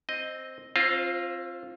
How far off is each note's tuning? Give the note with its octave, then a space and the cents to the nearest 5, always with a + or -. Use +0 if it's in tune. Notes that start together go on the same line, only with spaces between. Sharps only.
C4 +0 D#5 +0
C4 +30 F4 +0 C5 -10